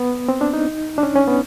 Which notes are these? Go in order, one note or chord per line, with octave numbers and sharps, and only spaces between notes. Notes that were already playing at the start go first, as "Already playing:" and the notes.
Already playing: B3
C4
D4
D#4
D4
C#4
C#4
B3